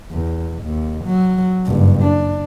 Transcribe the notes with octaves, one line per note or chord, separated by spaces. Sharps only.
E2
D#2
F#3
F#1 G2
D4